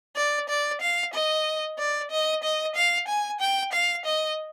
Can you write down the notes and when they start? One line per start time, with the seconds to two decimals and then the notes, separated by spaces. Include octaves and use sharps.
0.16 D5
0.49 D5
0.81 F5
1.13 D#5
1.78 D5
2.11 D#5
2.43 D#5
2.75 F5
3.08 G#5
3.40 G5
3.73 F5
4.05 D#5